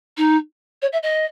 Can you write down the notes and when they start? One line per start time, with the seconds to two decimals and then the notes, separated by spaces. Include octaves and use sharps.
0.17 D#4
0.82 C#5
0.93 E5
1.03 D#5